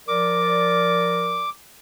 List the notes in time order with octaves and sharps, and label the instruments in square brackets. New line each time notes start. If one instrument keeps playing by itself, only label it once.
[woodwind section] F3 A#4 D5 [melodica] D6